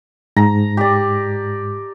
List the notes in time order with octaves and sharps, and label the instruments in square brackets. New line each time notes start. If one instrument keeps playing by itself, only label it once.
[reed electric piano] G#2 [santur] A#5
[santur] G4 D5